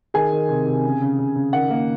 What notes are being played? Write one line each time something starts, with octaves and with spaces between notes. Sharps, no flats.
D#3 G#4 G#5
D#3
C3
C3
C#3
C#3
C#3
C#3
D#3 F#5
A#3